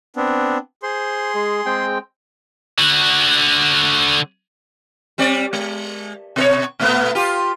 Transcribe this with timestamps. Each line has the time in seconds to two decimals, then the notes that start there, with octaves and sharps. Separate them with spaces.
0.16 B3 C4 D4
0.83 G#4 C5 C6
1.34 G#3
1.66 G#3 C4 G5
2.79 D3 F#4
5.18 G3 C4 D5
5.53 G#3
6.36 B2 A4 C#5
6.79 A#2 A3 B3
7.15 F4 G4